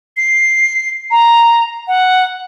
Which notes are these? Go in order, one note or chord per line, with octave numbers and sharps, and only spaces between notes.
C7
A#5
F#5